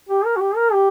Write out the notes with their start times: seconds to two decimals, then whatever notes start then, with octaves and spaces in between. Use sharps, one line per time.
0.09 G4
0.25 A#4
0.36 F#4
0.40 G4
0.56 A#4
0.73 G4